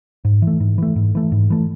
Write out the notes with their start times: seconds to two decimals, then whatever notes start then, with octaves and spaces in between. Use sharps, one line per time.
0.25 G#2
0.42 E3
0.47 A3
0.60 G#2
0.78 E3 A3
0.96 G#2
1.15 E3 A3
1.32 G#2
1.50 E3 A3